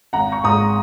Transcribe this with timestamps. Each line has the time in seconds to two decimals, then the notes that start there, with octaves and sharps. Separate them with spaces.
0.13 G#1 F#5 A#5
0.32 C#6
0.44 G#2 G#3 A#5 D#6